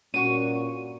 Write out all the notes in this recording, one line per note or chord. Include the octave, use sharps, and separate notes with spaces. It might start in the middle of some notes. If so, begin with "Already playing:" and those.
G2 A#2 C#4 F#4 C#6 D#7